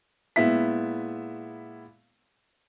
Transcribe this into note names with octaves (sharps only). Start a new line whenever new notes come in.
A#2 G#3 B3 E4 E5 B6